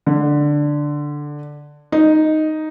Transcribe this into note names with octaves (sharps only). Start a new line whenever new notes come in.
D3
D#4